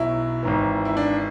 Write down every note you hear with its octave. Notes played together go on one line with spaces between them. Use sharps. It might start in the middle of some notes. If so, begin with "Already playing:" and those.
Already playing: B1 B2 F#3 E4
G#1 G#2 E3
E4
D4